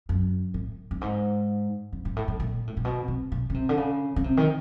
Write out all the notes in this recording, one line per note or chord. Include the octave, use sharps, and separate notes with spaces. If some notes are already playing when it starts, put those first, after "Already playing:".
F#2
A2
G2
G#2
G2
G#2
A2
A2
A#2
A2
A#2
B2
C3
B2
C#3
C3
D3
C#3
C#3
C3
D#3